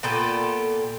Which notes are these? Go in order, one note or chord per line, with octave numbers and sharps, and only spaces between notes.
A#2 B3 G4 A4